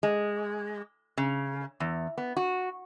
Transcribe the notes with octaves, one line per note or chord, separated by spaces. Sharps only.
G#3
C#3
E2
B3
F#4